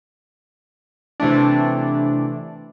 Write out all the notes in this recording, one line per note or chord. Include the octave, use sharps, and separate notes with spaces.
C3 E3 A3 D4